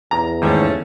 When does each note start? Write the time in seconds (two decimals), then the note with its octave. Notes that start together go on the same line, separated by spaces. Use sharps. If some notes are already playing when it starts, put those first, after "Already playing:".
0.11 E2 A#5
0.42 D#2 G#2 A3 C#4